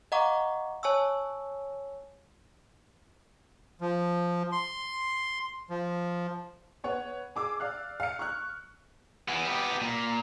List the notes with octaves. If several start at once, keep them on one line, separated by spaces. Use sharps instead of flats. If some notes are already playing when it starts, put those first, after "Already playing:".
D#5 F5 F#5 A#5 C#6 D6
C#5 G#5 A5 C#6 E6
F3
C6
F3
B3 C#5 F#5
G#4 D6 E6
D5 F5 F#6
F5 C#7
C#6 F6 F#6
E3 B3
B3 G4
A#2